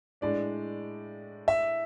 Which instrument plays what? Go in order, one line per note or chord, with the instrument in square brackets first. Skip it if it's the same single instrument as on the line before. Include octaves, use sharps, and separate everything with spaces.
[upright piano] A2 G#3 D4 [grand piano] D5
[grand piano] E5